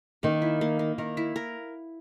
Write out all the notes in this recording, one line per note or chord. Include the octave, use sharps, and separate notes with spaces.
D#3 A#3
E4
A#3
A#3
D#3 A#4
E4
A#4